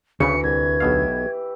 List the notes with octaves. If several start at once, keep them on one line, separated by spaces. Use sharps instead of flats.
D2 C#3 E3 F#4 B5 C#7
C2 G#6
B1 B2 G4 E5 F5